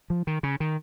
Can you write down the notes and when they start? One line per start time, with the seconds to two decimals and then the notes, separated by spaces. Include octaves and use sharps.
0.10 F3
0.27 D#3
0.43 C#3
0.60 D#3